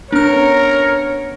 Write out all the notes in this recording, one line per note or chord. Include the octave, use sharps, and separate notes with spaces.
B3 C#4 D4 A#4 C#5 F6